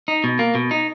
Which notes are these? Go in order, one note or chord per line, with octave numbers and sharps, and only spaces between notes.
D#4
B2
A#3
B2
D#4